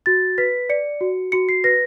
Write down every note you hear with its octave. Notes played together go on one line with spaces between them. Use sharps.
F#4 A6
B4 B6
D5 C#7
F#4
F#4 C#7
C7
B4 A#6